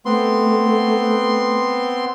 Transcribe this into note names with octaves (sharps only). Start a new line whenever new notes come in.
A3 B3 C4 C6